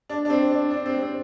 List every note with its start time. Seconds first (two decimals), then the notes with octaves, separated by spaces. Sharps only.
0.09 D4
0.25 D4
0.30 C4
0.51 D4
0.70 D4
0.86 C4
1.01 C4